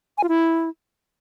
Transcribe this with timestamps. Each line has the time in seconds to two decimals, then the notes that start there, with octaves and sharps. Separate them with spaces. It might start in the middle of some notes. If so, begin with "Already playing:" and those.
0.18 G#5
0.23 F4
0.29 E4